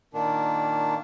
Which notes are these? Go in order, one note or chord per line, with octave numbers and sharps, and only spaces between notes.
A#2 D#3 D4